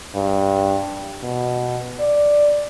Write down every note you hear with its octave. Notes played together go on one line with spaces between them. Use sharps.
G2
B2
D5